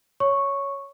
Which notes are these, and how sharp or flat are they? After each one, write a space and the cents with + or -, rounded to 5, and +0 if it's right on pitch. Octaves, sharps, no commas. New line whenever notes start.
C#5 +5 C#6 -5